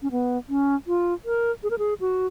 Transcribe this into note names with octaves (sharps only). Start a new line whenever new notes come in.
C#4
B3
C#4
F4
A#4
G#4
A#4
G#4
F#4